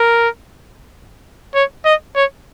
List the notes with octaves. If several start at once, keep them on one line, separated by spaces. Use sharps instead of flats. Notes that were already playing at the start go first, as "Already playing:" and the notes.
Already playing: A#4
C#5
D#5
C#5